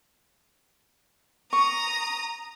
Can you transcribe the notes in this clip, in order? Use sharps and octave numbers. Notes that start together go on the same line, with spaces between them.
A#5 C#6 D#6